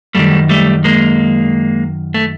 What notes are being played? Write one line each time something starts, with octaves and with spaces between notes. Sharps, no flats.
F#2 D#3 G3 A3
G3 A3
G#3 A#3
A3